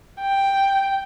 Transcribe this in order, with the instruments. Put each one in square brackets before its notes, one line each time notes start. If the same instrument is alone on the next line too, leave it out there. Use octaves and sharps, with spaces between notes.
[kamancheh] G5